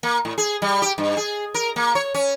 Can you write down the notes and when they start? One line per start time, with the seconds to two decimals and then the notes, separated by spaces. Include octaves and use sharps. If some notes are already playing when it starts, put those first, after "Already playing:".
0.03 A#3
0.25 A2
0.38 G#4
0.62 G3
0.82 G4
0.98 G2
1.17 G#4
1.54 A#4
1.76 A#3
1.95 C#5
2.14 C#4